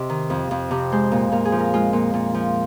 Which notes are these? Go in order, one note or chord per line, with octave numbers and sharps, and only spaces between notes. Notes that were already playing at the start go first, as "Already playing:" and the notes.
Already playing: C3 D#5
D#3
F2
F2
C3
G#3 C5
A#2
A#2 A#4
G#4
F3
A#4
G#3 F4
A#2
A#2
F3